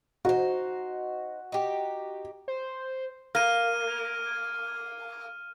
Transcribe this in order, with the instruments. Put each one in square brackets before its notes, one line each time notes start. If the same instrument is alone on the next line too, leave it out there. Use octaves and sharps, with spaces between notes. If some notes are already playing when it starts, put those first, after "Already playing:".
[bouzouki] D#4 C5 [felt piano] F#4
[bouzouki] D#4 G4
[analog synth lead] C5
[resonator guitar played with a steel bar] A#3 [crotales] F6 D#7